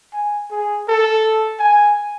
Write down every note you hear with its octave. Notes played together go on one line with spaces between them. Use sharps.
G#5
G#4
A4
G#5